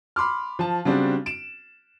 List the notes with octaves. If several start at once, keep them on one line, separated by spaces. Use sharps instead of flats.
B5 C6 D6 F6
F3 A5
C#3 G3 C4 D4 F#4
D7 E7